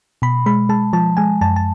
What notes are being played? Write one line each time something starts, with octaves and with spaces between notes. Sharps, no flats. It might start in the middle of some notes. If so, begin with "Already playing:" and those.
B2 B5
G#3 B5
G#3 A5
F3 A5
G#3 G#5
F#2 A5
A5